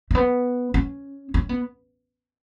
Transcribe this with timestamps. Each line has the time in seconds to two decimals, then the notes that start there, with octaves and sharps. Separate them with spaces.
0.11 A3
0.15 B3
0.74 C#4
1.34 C#4
1.49 B3